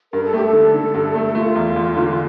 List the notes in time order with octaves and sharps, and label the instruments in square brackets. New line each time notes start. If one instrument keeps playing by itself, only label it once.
[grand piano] G2 [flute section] A#4
[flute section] A4
[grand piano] A3 [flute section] G4
[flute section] A4
[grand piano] D3
D3
G2
A3
[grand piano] A3 [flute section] F4
[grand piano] E2
E2
D3